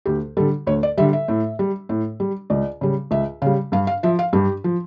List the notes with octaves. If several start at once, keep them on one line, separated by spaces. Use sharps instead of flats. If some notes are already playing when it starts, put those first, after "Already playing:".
D2 G4
D3 G3 A4
D2 C#5
D5
D3 G3 E5
E5
A2
G3
A2
G3
C#2 D5
C#3 G3
C#2 E5
C#3 G3 F5
G2 F5
F5
F3 E5
F5
G2 G4
F3